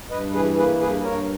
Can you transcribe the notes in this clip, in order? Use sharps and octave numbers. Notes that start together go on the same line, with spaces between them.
G2 B4 D#5
E3 G#4 B4
A#3 G#4 B4
G2 G#4 B4
G2 A#4 C#5